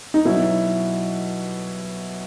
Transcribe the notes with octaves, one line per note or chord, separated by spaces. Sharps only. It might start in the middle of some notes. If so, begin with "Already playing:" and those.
D#4
B2 F#3 E4